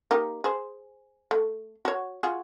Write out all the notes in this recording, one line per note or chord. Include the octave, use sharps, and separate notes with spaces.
A#3 D#4 G4
G#4 C5
A3
F#4 C#5
F4 F#4 G#4